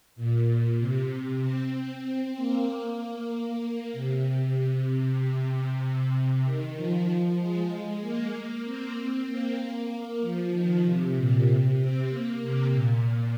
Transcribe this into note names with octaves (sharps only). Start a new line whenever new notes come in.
A#2
C3
C3
C4
A#3
A#3
A#3
C3
C3
C3
D#3
F3
G#3
G#3
A#3
C4
A#3
F3
D#3
C3
A#2
C3
C4
A#3
C3
A#2
A#2